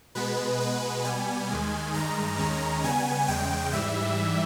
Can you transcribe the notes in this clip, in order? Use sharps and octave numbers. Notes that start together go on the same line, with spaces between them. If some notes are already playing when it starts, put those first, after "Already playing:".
B2 G#3 B3 B4
B2 G#3 B3 B4
B2 G3 B3 G#5
D#2 D#3 G#3
G2 D#3 G#3 A#5
D#2 D#3 G#3 C#4
C#3 G3 B3 G#5
E2 C#3 G#3 G5
G#2 E3 G3 E5